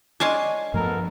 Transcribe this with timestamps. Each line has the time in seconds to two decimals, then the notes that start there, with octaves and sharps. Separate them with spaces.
0.20 G#3 C#4 D4 G#5 A5 C6
0.74 G2 F3 A3 B3 A4 A#4